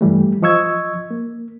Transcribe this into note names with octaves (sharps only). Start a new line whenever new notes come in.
G2 E3 G3 A3
F3 D#5 C#6 E6 G#6
A#3